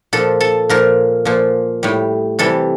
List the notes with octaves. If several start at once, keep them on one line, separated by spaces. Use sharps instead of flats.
A#2 F3 A4
A4
A#2 F3 A#4
A#2 F3
A2 G3
C3 E3 G3 A4